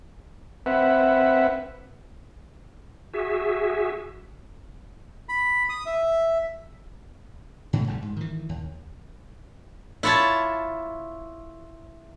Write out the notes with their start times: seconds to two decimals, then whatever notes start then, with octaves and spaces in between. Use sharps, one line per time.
0.66 C4 B4 E5 F#5
3.14 F#4 G#4 E5
5.29 B5
5.69 D#6
5.86 E5
7.73 G#2 B2 D3 A3
7.87 G#1 G#2 G3
8.02 G#2
8.16 D#3 E3
8.49 D#2
10.03 E4 F4 C#5 E5 A5